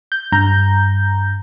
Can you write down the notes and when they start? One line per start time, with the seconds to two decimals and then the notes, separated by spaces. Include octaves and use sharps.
0.12 G6
0.32 G2 A#5 G6